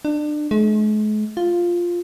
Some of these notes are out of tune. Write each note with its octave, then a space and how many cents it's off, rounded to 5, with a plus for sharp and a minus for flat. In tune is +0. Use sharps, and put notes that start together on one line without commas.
D4 +30
G#3 +45
F4 +0